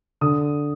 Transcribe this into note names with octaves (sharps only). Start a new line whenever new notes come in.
D3 D#6